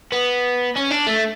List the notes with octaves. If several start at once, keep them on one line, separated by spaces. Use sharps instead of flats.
B3
C#4
D4
A3